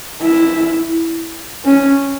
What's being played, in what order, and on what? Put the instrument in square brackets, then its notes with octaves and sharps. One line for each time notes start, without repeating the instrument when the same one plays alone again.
[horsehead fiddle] E4
C#4